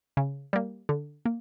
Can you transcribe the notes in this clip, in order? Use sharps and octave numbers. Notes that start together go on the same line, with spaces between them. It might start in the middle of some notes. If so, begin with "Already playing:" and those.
C#3
G3 A#3
D3
A#3